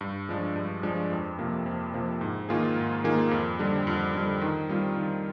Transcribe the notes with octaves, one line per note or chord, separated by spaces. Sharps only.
G2
F3 G#3 D4
G2
F3 G#3 D4
F2
C3 F3 A#3
F2
C3 F3 A#3
G#2
D#3 A#3 F4 G#4
G#2
D#3 A#3 F4 G#4
F2
D3 G3
F2
D3 G3
D#3
G3 C4 F4
D#3